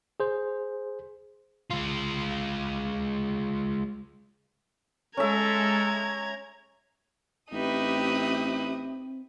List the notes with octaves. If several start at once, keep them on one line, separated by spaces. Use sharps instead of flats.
G#4 C5
G#3 F4
G#3 C#4 A4 E5 A#5 G#6
A1 C4 D#4 G4 B4 E5 D#6